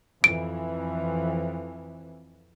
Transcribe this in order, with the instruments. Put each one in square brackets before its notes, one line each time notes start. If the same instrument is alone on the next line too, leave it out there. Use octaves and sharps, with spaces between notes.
[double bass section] F2 E3 [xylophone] D7